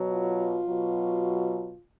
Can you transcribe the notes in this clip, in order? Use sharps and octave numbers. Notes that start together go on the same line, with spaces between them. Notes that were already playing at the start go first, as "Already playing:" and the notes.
Already playing: B2 F#3
F4
B2 F#3